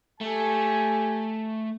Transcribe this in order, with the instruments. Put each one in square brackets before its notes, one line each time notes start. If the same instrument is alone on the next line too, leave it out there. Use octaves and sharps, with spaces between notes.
[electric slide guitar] A3 [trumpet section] G4 A4 G#5